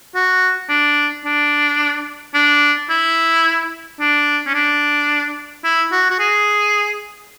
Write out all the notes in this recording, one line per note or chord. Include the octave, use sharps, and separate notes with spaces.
F#4
D4
D4
D4
E4
D4
C#4
D4
E4
F#4
F#4
G#4